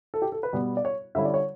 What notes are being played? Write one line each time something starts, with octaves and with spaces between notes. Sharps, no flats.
A4
G4
A4
B4
B2 G3 B3
D5
C#5
D3 G3 C#4 E4 E5
D5
C#5